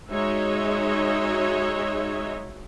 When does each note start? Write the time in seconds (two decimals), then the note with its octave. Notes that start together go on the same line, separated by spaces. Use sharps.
0.10 G#3 D#4 F#4 C#5 D#5 E5